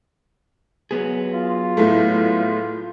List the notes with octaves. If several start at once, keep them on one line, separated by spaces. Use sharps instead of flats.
F#3 B3 G#4
F4
A2 A3